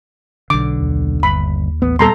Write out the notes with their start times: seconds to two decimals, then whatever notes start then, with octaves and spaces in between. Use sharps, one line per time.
0.50 B1 D3 D6
0.79 D#2
1.23 G1 B5
1.82 A1 B3
1.99 A#2 G3 B3 A4 A#5 C6